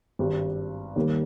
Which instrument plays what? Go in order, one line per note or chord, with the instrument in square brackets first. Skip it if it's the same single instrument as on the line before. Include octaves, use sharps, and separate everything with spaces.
[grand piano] G#1 G2 G3
D#2 D#3 G3 A#3